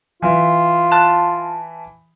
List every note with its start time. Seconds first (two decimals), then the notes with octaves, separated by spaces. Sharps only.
0.22 E3 F4 E5
0.92 A5 F6 F#6